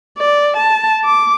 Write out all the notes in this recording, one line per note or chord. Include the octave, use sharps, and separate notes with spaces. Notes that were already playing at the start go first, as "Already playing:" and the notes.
D5
A5
D6